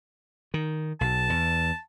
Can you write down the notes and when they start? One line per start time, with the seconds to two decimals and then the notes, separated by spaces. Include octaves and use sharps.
0.54 D#3
1.01 B1 A5
1.30 E2